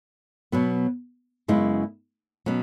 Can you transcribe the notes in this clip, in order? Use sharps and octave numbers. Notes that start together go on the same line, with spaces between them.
B2 F#3 B3
F#2 C#3 G#3 B3 E4
B2 F#3 C#4